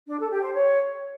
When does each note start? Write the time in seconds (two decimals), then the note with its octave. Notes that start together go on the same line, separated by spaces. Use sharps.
0.08 D4
0.19 A4
0.31 G4
0.42 C5
0.54 C#5